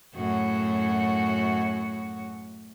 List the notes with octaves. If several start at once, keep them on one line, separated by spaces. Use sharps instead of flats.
F#2 A2 F#4